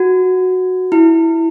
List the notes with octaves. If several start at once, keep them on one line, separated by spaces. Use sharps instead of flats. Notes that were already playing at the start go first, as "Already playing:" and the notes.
Already playing: F#4
E4